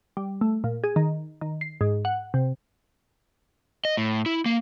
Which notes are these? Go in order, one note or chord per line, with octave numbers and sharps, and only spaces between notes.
G3
A3
A#2
G#4
D#3
D#3
C7
G#2
F#5
C3
D#5
A2
E4
A#3